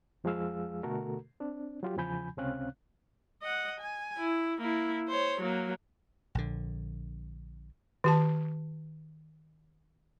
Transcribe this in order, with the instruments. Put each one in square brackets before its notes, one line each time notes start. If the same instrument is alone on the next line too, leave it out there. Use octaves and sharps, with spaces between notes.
[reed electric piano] F2 F3 G#3 G#4 F5 E6
B2 D3 A3 F#4 A4 A#4
C4 D4
F#3 F4 G4
E2 C#3 F3 G#5 B5 G6
C#2 C3 C4 C#4 F5 F#6
[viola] D#5 F#5
G#5
E4
A#3 E4
C5 C#5
F#3 A#3
[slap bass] A#1 D3
[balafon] D#3 G4 A5